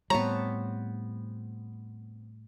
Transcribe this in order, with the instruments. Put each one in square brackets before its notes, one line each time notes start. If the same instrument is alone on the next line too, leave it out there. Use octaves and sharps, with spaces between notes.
[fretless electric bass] A2 G3 [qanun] B3 C4 A5 [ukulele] C#5 [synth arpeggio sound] A#5